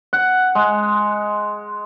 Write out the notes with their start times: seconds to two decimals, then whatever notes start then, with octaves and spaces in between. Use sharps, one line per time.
0.13 F#5
0.55 G#3